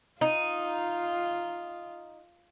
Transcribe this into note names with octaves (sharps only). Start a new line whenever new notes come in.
D#4 F4